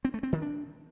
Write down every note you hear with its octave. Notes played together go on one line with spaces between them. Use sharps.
C4
A3
C4
D#3
D4